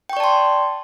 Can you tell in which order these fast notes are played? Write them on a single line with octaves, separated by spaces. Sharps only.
G5 C#6 D5 A5 C6